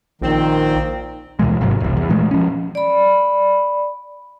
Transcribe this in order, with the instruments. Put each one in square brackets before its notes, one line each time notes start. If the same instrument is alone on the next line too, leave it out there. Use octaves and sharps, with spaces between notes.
[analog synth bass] A#1 [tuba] A#2 [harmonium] D#3 [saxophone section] C4
[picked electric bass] D#2 B2 E3 G#3
G#1 G#2 C3 F#3
E1 C2
E2
A#2 E3 G#3 A3
F3 C#4
[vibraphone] D5 B5